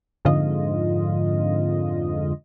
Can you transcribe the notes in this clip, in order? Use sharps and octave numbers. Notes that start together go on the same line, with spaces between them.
F2 G#2 D3 F4 D#5